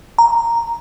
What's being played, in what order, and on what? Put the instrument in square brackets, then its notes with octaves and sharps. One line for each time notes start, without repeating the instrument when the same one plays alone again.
[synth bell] A#5